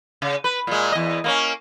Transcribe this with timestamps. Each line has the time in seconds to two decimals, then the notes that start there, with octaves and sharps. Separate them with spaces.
0.22 C#3
0.44 B4
0.67 A#2 G#3
0.92 E2 D#5
1.24 A#3 B3 C#4